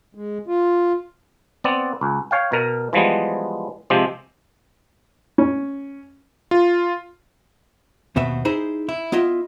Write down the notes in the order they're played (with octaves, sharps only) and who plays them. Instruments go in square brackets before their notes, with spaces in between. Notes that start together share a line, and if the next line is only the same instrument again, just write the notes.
[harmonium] G#3
F4
[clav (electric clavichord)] B3 C4 D5
C#2
C#5 F5 G5
B2 A#4
E3 F3 G3 G#3 B3
C3 F3 G#3 C4 G4
[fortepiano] C#4
[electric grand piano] F4
[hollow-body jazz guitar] D#2 B2 B3 C4 E5
D#4 E4 G#4 C5
E4
B3 E4 F4 D#5 E5